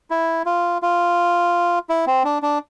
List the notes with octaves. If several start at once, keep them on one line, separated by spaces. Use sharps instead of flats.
E4
F4
F4
E4
C4
D4
D4